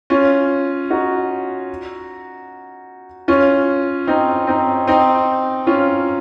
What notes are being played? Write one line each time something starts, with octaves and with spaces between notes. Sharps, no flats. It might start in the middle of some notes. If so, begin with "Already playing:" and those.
C#4 F4
D#4 F#4
C#4 F4
C4 D#4
C4 D#4
C4 D#4
C#4 F4